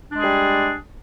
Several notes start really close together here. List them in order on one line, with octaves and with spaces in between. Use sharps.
D4 G#3 G#4 G3